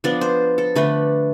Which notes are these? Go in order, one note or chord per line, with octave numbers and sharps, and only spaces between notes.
F3 B3 D4 D5
C5
A4
D3 A3 D4 B4